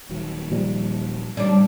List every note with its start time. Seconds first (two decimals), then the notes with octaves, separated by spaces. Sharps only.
0.09 D#1 D#3 F#3
0.51 A#2 F3 G3
1.37 A1 G#2 C#3 G3 D4